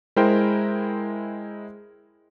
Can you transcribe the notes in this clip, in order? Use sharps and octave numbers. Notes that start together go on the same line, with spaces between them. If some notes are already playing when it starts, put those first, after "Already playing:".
G#3 E4 A#4 C5 G5